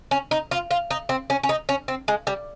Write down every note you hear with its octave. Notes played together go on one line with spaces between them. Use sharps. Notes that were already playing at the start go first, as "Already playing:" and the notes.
C#4
D#4
F4
F4
D#4
C4
C#4
C#4
D#4
C#4
C4
G#3
G3